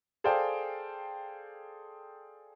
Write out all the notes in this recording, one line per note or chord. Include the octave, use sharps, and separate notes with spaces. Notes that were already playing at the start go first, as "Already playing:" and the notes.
G#4 A4 C5 D5 F5 G5